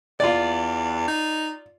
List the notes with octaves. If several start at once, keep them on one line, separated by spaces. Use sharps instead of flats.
E2 F4 D5
D#4